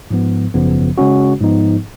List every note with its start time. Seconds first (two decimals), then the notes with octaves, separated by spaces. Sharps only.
0.11 G#2 F3 B3
0.54 G#1 F#2 C#3 F3 B3
0.98 C#3 G#3 C#4 F#4
1.41 G#2 F3 B3 D#4